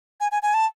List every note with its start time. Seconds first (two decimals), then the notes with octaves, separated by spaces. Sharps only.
0.20 G#5
0.32 G#5
0.42 G#5
0.54 A5